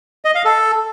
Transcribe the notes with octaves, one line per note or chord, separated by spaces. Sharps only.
D#5
F5
A4